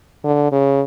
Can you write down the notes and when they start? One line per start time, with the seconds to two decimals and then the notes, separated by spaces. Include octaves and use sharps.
0.24 D3
0.52 C#3